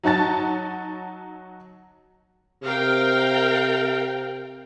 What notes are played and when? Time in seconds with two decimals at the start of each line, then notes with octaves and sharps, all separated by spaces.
0.03 F#3 D#4 F#4 A5 A6
2.63 C3 A#4 F5 G5